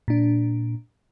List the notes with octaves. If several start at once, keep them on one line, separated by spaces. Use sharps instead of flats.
A#2 D4